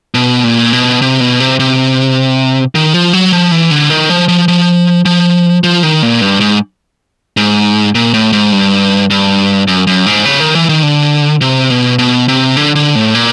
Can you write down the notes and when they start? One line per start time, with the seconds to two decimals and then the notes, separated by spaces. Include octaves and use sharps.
0.15 B2
0.44 A#2
0.73 B2
1.02 C3
1.20 B2
1.40 C3
1.60 C3
2.75 D#3
2.94 F3
3.13 F#3
3.33 F3
3.51 E3
3.71 D3
3.90 D#3
4.10 F3
4.28 F3
4.48 F3
5.05 F3
5.64 F3
5.83 D#3
6.02 A#2
6.21 G2
6.40 G#2
7.37 G#2
7.95 A#2
8.14 A2
8.33 G#2
8.52 G2
9.11 G2
9.68 F#2
9.87 F#2
10.06 G#2
10.25 C#3
10.40 D#3
10.55 E3
10.69 D#3
10.83 D3
11.41 C3
11.70 B2
11.99 B2
12.28 C3
12.56 D3
12.76 D3
12.95 A2
13.14 A#2